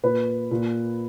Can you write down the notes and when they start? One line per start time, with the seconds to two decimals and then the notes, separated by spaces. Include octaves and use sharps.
0.03 A#2 B4
0.51 A#2